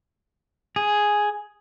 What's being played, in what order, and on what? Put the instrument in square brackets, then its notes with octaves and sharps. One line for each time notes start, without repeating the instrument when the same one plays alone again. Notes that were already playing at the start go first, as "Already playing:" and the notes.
[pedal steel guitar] G#4